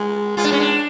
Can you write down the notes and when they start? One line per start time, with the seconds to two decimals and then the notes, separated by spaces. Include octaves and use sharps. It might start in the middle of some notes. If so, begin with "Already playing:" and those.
Already playing: G#3
0.37 G#3 F4
0.44 D4
0.52 C#4
0.60 D4